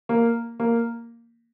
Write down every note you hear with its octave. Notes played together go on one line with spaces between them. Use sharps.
A#3
A#3